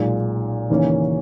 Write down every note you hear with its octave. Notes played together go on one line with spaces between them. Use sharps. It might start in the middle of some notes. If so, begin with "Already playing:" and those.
Already playing: B1 A#2 G#3
D#2 C#3 E3 A#3 C#4